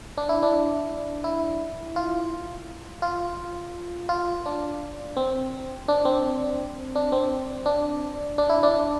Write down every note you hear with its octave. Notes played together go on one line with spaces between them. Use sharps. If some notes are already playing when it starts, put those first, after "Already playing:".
D4
E4
D4
E4
F4
F4
F4
D4
C4
D4
C4
D4
C4
D4
D4
E4
D4